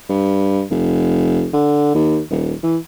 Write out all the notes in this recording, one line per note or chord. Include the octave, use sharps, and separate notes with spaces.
G2
F1
D3
D#2
D#1
E3